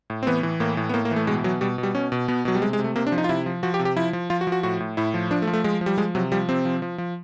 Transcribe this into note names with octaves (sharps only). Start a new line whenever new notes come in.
A2
C4
E3 B3
E3
A2 A#3
A2
B3
A2 A#3
A#3
E3
A3
B2 G#3
B2 F#3
B2 G3
B2
G3
B2 C#4
B2
B2 B3
B2 F#3
G3
C3 G#3
G#3
C3
A3
C3 A#3
D4
F3
D#4
F4
C3 E4
F3
F3 F#4
G4
C3
G4
F3 E4
F3
F3 F4
F#4
F3
F#4
A2 F#4
A2
A2 E4
F3
F3 D4
A3
F3
A3
F3 G#3
F3
G3
F3 G#3
C3 F#3
F3 G3
C3 C4
F3
F3
F3